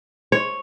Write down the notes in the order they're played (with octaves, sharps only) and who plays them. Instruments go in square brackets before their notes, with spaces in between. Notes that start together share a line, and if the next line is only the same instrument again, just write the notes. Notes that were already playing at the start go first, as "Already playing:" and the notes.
[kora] C#5